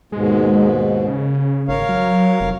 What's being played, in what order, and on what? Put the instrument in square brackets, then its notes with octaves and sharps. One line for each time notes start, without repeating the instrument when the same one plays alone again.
[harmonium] D#2 G#2 B2 [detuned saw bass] G#3
[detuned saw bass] C#3
[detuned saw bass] G#1 [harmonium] A#4 C#5 F5
[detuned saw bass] F#3
F1